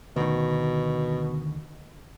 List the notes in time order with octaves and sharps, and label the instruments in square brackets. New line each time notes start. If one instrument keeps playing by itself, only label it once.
[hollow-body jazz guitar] D2 D#3 [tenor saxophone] B2